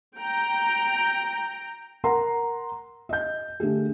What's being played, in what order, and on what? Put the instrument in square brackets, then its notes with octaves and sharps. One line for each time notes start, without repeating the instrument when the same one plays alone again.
[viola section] G5 A#5
[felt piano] A#4 F#5 A#5 C6
D#5 G6
D3 A3 G4 G#4